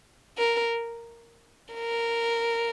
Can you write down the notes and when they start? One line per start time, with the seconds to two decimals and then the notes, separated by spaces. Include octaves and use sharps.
0.38 A#4
1.74 A#4